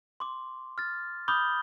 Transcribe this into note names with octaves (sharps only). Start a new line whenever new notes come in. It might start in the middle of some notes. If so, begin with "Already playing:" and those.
C6 D6
F6 A6
B5 D6 D#6 F6 G6 G7